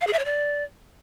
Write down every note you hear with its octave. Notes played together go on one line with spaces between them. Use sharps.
F5
G#4
E5
C#5
D5